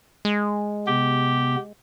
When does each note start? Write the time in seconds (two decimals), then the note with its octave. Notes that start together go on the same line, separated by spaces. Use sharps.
0.25 G#3
0.87 C3 B3 G4